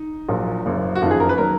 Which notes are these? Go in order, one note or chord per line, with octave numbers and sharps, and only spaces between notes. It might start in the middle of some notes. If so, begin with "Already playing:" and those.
Already playing: D#4
A#1 A#2 F#3
F#1 F#2 C#3
F#4
F#1 F2 D#3 F4
G#4
A#4
B4
D#3 F#3 A#4